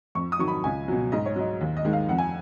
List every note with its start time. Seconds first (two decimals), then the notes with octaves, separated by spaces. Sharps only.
0.15 F2 C#6
0.32 D#6
0.39 D#3 F#3 C#6
0.48 B5
0.64 C#2 G#5
0.88 B2 F#3
1.12 G#2 D#5
1.26 C#5
1.36 F#3 D#5
1.61 D#2
1.77 D#5
1.85 D#3 G#3
1.93 F5
2.09 F2 F#5
2.18 G#5